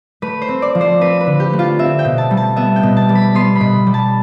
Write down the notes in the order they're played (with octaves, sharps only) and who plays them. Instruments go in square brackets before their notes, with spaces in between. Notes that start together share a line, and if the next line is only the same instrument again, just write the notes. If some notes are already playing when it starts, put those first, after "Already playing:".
[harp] A3 B4
C5
C4
D5
F3
C5
C4 B4
B4
D3
G4
A3
F4
C4 E5
G5
B2
A5
G3
A5
B3 E5
G5
B2
A5
G3
B5
B3 C6
B5
B2
G3
A5